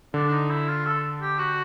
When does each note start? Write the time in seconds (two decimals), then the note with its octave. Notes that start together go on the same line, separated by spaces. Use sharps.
0.14 D3 D4
0.28 D4
0.31 D#4
0.50 E4
0.68 F4
0.86 A4
1.22 G4
1.39 F#4